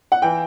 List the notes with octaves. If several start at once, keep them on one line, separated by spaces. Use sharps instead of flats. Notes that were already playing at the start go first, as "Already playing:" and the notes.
F#5
E3 G5